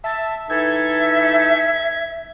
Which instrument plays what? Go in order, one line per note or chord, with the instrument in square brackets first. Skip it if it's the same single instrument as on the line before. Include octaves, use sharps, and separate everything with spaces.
[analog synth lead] E5 [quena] A5
[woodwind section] E3 D#4 A4 [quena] E5 [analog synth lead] G#6